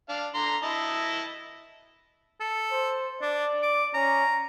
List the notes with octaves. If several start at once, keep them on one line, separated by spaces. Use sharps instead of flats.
D4 F5
D3 A#5 C6
E4 D#5 A5
A4
C5
D4 D5
D6
C#4 A#5